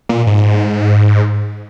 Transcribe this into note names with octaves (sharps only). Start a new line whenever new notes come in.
A#2
G#2